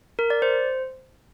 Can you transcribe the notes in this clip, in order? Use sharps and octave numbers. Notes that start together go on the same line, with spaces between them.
A#4
D5
C5